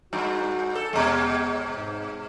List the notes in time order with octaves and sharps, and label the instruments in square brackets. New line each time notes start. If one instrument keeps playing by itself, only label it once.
[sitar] G2 [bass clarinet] F#4
[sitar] A4
[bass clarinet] E2 [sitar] B2 G#3
[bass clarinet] G#2